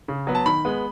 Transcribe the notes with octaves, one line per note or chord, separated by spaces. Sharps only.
C#3
F#3 B3
A5
D#3 B5
G#3 B3